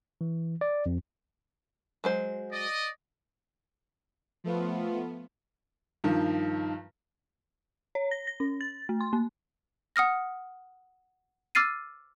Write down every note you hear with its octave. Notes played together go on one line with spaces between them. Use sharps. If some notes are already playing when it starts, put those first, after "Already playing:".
E3
D5
F2
F#3 G#3 C5
D5 D#5
F3 A3 B3 F4
G2 D#3 F3
C#5
A#6
A#6
C#4
A6
A3
C6
A#3
F#5 D#6 F6 A#6
D6 E6 F6 A6 C7 D#7